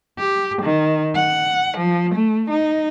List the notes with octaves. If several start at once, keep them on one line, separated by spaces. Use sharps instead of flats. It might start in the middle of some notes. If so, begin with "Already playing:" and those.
G4
D#3
F#5
F3
A3
D#4